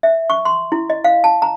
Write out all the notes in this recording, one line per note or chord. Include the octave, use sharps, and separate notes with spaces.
E5
C#6
C6
E4
D#5
F5
A5
A#5